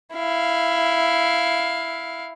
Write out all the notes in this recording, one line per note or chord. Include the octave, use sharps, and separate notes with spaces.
E4 F5